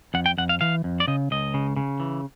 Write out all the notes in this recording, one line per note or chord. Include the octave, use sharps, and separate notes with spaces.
F2 F#5
G5
F2 F#5
F5
E3 F5
F2
D5
C#3 D#5
C#2 D#5
C#3
C#3
E3